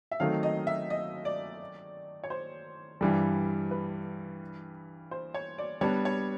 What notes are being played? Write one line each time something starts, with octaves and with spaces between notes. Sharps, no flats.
E5
D#3 F#3 A3 C4 D#4 F5
D#5
E5
D#5
D5
C#5
C5
G2 E3 G3
B4
C5
C#5
D5
G3 B3 D4 C#5
C#5